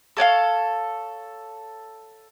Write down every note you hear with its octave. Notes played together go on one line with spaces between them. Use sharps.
A4 C#5 D5 F5